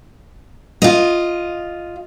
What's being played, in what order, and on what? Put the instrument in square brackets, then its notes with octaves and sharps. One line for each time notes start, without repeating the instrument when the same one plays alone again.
[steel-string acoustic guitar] F4 D#5